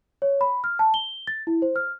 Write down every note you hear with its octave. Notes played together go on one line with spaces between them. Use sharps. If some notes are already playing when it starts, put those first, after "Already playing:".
C#5
B5
F6
A5
G7
A6
E4
C5
F6